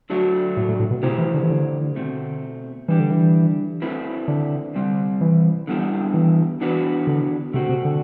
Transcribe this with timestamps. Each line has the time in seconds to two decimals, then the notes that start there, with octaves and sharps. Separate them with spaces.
0.10 D3 F#3 A3 D4 F#4
0.57 A2
0.69 A2
0.80 A2
0.91 B2
1.03 C3 A3 E4 G4 C5
1.19 E3
1.34 D3
1.43 E3
1.50 D3
1.96 B2 A3 C4
2.88 E3 G3 D4 G4
3.00 D3
3.11 E3
3.82 A3 C4 E4 B4
4.28 D3
4.75 C3 G3 C4
5.21 E3
5.67 D3 G3 B3 E4 G4
6.14 E3
6.61 E3 B3 D4 F#4 B4
7.07 D3
7.53 C3 A3 C4 F#4
7.69 C3
7.85 D3